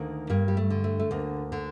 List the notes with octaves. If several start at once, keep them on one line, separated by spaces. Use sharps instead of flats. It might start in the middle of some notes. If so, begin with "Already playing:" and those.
Already playing: D2 D#3 A#3
G2 A#3
G3
A3
D3
A3
A3
D2 A#3
D3